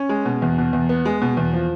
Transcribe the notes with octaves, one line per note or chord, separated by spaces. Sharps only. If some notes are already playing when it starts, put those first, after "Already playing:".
Already playing: C#4
G#3
B2
E2
B2
E2
B3
G#3
B2
E2
F3